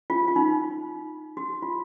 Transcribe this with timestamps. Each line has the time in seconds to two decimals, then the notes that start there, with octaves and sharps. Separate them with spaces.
0.10 F4
0.28 F4
0.36 D#4
1.37 F#4
1.62 F4